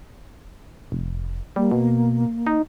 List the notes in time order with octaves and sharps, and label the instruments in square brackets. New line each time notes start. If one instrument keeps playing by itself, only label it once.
[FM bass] F1
[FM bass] G3 [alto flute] A#3
[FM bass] B2
D#4